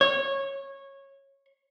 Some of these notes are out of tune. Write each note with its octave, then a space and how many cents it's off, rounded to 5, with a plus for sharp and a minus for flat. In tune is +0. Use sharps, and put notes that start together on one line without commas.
C#5 -15